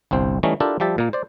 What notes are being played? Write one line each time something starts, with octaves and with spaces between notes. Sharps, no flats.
G1 C2 C4 C5
E3 G3 A3 C#4 D#4
D4 E4 F4 G4 A4 A#4
F3 G3 G4 E5 A5
A#2 A#3
C5 D5